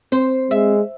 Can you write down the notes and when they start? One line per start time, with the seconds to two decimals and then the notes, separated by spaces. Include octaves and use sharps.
0.12 C4 C5
0.51 G#3 E5